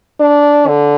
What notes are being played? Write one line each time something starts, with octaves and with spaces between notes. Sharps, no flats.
D4
D3